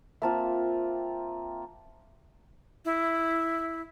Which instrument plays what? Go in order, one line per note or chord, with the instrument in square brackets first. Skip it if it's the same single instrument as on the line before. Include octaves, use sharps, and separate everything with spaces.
[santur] A#3 C4 F4 [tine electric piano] E5 A5
[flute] E4